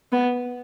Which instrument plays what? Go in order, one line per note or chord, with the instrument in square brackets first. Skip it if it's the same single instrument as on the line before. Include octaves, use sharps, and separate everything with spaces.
[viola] B3